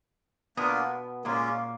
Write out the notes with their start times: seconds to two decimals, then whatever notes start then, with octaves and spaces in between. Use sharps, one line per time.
0.57 B2 A#3 B3 D4 F4 A#4
1.25 A#2 G#3 A#3 C#4 F4